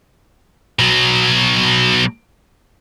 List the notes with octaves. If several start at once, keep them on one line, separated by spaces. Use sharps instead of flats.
B2 F#3